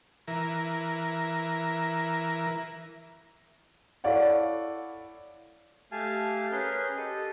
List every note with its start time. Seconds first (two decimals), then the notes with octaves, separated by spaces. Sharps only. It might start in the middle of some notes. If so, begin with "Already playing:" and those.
0.28 E3 A#4
4.04 E4 A4 C#5 D5 F5 F#5
5.92 A3 G4 F5 G#5 A5 F6
6.52 C#4 G#4 A#4 B4 G6
6.97 G4 A4 D#5